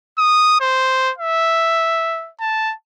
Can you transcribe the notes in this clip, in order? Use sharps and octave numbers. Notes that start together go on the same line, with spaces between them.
D#6
C5
E5
A5